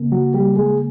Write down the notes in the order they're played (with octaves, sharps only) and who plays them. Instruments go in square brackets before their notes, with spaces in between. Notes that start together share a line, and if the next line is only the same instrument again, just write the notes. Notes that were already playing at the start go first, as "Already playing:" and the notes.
Already playing: [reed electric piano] C#3 A#3
F#3 F#4
G3 G4
G#3 G#4